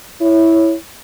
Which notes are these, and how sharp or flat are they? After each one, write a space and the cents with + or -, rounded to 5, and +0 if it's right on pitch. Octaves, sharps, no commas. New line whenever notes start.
E4 -5 C#5 +0